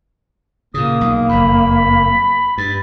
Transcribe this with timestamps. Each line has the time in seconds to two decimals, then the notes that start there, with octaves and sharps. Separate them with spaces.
0.74 A#2 C#3 A#3 D#6
1.01 B1
1.29 F#1 F2 B5
2.58 G2 A6